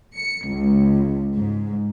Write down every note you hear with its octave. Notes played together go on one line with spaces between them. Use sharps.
C#7
C#2
G#2